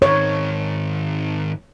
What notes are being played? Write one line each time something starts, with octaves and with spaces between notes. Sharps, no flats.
G#2 D#3 C#5